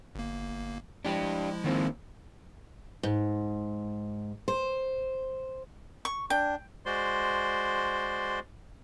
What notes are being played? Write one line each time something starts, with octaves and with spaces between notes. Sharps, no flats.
G1 A#3
F3 G#3 D4 E4 G4
D#3 A#3 C4
G#2
C5
C#6
D4 G5
G#3 F#4 C5 D5 C6